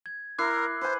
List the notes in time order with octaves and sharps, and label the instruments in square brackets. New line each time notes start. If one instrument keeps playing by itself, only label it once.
[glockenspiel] G#6
[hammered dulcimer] E4 [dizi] A#4 [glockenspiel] D6 F#6 C7
[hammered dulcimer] B4 G#5 [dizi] C5